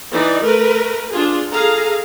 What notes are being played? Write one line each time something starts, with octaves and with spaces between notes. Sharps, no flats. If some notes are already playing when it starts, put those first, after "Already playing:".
E3 D#4 D5
A3 A#4 B4
D4 F4 G#4
G#4 A4 F5 A#5